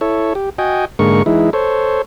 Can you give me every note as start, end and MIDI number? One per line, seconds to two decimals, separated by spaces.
0.01 0.33 64
0.01 0.33 69
0.01 0.33 73
0.35 0.50 67
0.59 0.85 66
0.59 0.85 75
0.59 0.85 79
0.59 0.85 80
0.99 1.23 44
0.99 1.23 50
0.99 1.23 56
0.99 1.23 58
0.99 1.23 70
0.99 1.23 85
1.26 1.50 52
1.26 1.50 56
1.26 1.50 63
1.26 1.50 64
1.53 2.02 69
1.53 2.02 72
1.53 2.02 73